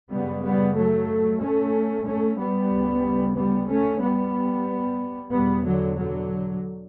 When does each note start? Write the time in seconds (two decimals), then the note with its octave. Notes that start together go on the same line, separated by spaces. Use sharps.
0.10 F#2 C#3 G3 B3
0.42 G3 B3
0.76 F#3 A3
1.40 A3 C#4
2.05 A3 C#4
2.38 G3 B3
2.71 D2 C#3
3.35 G3 B3
3.69 A3 C#4
4.01 G3 B3
5.31 E2 B2 G3 B3
5.64 D3 F#3
5.96 D3 F#3